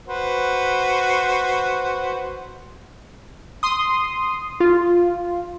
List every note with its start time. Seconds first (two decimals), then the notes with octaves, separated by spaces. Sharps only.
0.08 F#4 B4 C5
3.63 C6 D#6
4.60 F4